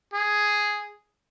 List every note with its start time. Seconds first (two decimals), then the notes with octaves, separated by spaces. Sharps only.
0.14 G#4